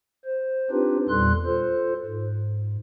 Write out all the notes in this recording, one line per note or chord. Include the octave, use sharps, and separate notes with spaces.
C5
C4 D4 D#4 F4 G4 B4
E2 A#2 G3 A4 C6 F#6
F4 A4 C5
G#2